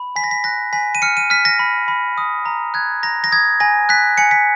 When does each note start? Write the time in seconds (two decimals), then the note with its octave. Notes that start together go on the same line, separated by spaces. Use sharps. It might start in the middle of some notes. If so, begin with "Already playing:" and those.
Already playing: B5
0.16 G#5 B6
0.24 A#6
0.31 B6
0.44 F#6 A#6
0.73 G#5 B6
0.95 D#7
1.02 F6 C#7
1.17 D#7
1.30 F6 B6
1.45 A#6
1.59 B5
1.88 B5
2.18 D#6
2.46 A#5
2.74 F#6 G#6
3.03 A#5 A#6
3.24 A#6
3.32 D#6 G#6
3.60 G#5 A#6
3.89 F#6 B6
4.18 G#5 C#7
4.31 B6